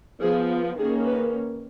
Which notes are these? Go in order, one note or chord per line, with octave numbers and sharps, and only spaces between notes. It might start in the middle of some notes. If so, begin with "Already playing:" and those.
F3 B3 G#4
D#3 A#3 C#4 G#4
B4